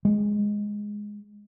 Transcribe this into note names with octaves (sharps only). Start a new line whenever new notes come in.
G#3